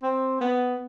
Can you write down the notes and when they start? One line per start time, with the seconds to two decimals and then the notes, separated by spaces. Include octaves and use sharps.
0.03 C4
0.41 B3